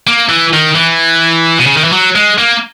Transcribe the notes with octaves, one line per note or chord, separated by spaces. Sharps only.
A#3
E3
D#3
E3
B2
C#3
D#3
E3
F#3
G#3
A#3